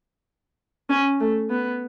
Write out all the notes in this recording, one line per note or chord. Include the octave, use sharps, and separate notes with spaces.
C#4
A3
B3